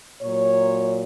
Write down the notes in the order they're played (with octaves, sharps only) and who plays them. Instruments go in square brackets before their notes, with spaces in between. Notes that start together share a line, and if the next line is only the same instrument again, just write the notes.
[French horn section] A#2 F#3 C#5